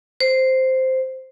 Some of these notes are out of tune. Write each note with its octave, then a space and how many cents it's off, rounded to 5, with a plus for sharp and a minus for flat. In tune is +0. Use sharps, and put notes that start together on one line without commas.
C5 -5